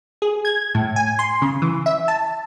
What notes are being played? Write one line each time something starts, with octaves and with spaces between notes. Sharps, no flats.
G#4
G#6
A2
G#5
C6
C#3
E3
E5
A5